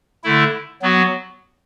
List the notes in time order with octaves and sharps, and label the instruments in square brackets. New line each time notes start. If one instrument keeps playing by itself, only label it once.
[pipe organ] D3 A3 E4
F#3 B3 F#4